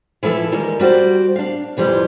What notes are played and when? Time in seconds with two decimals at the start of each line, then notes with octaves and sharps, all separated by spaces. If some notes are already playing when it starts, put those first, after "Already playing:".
0.23 E3 F3 E4 A4 A5
0.52 D#3 G3 G#3 A#3
0.80 G3 F#4 C5 D5
1.36 D4 F5
1.77 F2 E3 F3 G3